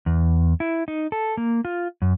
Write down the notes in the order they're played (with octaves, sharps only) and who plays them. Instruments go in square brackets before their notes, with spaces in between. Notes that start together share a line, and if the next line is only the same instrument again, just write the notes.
[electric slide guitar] E2
E4
D#4
A4
A#3
F4
F#2